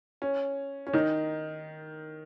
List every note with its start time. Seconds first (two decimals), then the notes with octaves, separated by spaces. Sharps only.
0.22 C#4
0.87 C#4
0.93 D#3 D#4